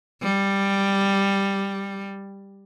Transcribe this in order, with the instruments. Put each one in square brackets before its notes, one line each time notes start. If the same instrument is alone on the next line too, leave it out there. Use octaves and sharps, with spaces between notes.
[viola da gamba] G3